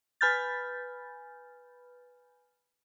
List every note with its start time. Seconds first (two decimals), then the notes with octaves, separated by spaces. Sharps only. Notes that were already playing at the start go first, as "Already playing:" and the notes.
0.21 B4 G#5 B5 F6 G6 A6